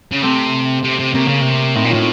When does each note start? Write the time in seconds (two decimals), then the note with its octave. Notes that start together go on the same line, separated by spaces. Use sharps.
0.12 C#3
0.22 C3 A3 C4
0.83 C3
0.99 C3
1.14 C3 A#3 C#4
1.28 C#3
1.41 C3
1.76 A2 C4 D#4
1.85 A#2
1.90 A2 C#4 F4